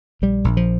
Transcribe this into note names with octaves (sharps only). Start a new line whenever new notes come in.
A#1 G3
A#1
F3